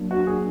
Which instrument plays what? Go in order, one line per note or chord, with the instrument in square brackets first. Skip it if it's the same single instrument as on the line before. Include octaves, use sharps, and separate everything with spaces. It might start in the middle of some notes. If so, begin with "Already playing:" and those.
Already playing: [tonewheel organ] F#3 A#3 D4
[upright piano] F#4
G#4